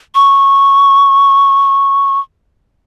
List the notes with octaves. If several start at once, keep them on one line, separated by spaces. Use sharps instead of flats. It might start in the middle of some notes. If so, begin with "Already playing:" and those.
C#6